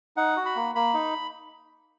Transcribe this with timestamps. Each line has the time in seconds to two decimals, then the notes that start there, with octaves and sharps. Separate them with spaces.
0.17 D#4 F#5
0.37 F#4
0.46 B5
0.56 A#3
0.75 A#3 B5
0.94 D#4